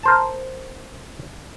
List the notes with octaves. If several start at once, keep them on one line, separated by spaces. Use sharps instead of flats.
A#4 C5 A5